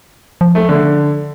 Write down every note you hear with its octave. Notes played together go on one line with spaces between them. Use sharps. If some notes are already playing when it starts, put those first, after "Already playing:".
F3
A3
D3